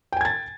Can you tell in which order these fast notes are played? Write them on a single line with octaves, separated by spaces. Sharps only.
G5 G#5 G#6 A6